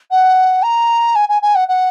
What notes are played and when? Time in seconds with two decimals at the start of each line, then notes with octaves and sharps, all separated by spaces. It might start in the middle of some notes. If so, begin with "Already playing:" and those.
0.11 F#5
0.62 A#5
1.15 G#5
1.29 G#5
1.42 G#5
1.55 F#5
1.68 F#5